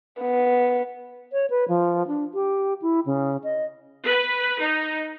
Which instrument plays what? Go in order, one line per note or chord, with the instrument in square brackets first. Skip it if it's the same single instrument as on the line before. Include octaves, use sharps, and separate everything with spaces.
[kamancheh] B3
[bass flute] C#5
B4
F3
D4
G4
E4
C#3
D#5
[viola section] B4
D#4